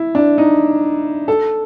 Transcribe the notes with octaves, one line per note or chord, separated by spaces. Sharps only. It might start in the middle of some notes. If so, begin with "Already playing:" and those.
Already playing: E4
D4
D#4
A4